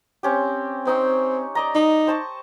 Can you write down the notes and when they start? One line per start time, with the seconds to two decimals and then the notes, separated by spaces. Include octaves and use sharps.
0.23 C4 C#4 G4
0.87 C4 D#4 C#6
1.55 D5 D#5 A#5
1.75 D#4
2.07 C5 A5 C#6